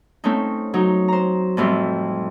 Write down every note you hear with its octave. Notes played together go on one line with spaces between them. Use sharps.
A3 C4 C#4 D#4
F#3 D#4
C5 A#5
F2 A2 G3 C4 C6